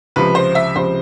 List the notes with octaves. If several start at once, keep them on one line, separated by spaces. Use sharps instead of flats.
C#2 C3 F3 B4
C5
E5
C#2 C3 F3 C5